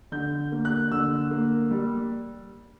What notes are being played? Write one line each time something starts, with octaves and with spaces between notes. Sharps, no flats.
D3 G6
A#3
F#6
D3 E6
A#3
G3